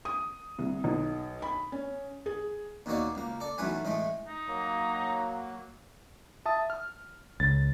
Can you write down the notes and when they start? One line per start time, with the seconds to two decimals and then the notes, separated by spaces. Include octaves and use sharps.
0.05 D#6
0.59 C2
0.84 B1
1.42 B5
1.72 C#4
2.26 G#4
2.86 D#2 B2 D#3 A#3 C#5 D5
3.15 C#2 A#3
3.40 A4 D5
3.58 B1 F#2 E3 A3 B4 G#5
3.85 A2 E3 G#3 A3
4.27 D#4
4.48 F#3 A#3 A#5
6.45 E5 A5 D#6
6.70 F6
7.40 C#2 A6